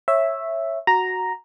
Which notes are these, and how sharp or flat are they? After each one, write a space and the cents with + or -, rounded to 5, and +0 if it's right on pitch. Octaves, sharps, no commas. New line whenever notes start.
C#5 -15 E5 +0
F#4 +0 A#5 +0